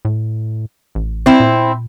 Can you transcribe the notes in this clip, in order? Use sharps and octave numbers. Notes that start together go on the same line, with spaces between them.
A2
A1
C4 E4
A#2